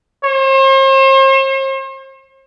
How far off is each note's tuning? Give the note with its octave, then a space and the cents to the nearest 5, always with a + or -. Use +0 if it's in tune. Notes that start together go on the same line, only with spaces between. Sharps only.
C5 +45